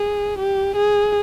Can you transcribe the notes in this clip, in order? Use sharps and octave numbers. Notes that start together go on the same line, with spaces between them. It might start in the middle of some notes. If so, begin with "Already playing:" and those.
Already playing: G#4
G4
G#4